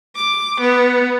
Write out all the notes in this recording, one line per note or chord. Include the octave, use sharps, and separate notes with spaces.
D6
B3